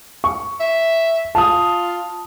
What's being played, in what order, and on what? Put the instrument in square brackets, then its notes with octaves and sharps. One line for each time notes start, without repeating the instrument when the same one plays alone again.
[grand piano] C#6
[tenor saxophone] E5
[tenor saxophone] F4 [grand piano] A5 D#6